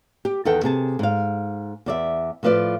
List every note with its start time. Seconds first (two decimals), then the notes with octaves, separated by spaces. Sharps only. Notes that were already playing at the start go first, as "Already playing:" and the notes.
0.25 G4
0.45 E2 D#3 B3 A4 F#5 G5
0.63 C3 G#4 A5
0.99 G#2 F5
1.86 E2 D5 E5
2.43 A2 F3 F4 B4 D5